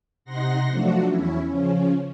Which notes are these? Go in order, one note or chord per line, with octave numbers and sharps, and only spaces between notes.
C3 D#4 F#5 C6 A#6
F3 F#3 A3 D4 F#4
E2 C#4 E4
C#3 F3 C#4